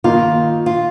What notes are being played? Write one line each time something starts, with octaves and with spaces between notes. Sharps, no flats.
D#3 A#3 D#4 F4 A#4
F4